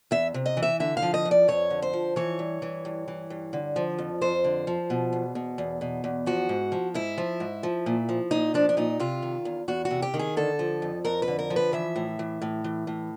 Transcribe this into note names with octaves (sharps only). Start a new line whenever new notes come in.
E2 E5
C3
D#5
E3
E5
D3 E5
F5
F3
D#5
F2
D5
F2 C#5
D3
C5
F3
E3 C#5
G2
E3
G2
E3
G2
D3
F3
F2
F2 C5
D3
F3
B2
E2
B2
E2
B2
E2
F3 F#4
G#2
F3
G#2 E4
F3
G#2
F3
A#2
F3
A#2 D#4
F3 D4
D4
A#2 D#4
C3 F4
D#3
E2
E2 F#4
F#4
C3
G4
D#3
G#4
D3 A4
F3
F2
F2 A#4
B4
D3
A#4
F3
B4
E3 E5
A2
E3
A2
E3
A2